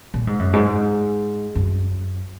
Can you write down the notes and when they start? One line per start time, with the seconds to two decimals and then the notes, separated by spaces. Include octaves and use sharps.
0.14 A#2
0.27 G#2
0.39 F#2
0.53 G#2
1.55 F#2